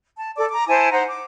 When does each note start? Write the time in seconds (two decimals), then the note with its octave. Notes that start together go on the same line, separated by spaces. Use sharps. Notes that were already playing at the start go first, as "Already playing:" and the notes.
0.18 A5
0.36 A4 D5 D6
0.51 A#5 D6
0.68 E4 C5 G#5 A5
0.91 D#4 C5 F#5 A#5
1.07 D6